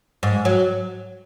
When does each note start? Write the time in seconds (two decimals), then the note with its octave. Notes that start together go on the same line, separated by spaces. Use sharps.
0.23 G#2
0.45 F#3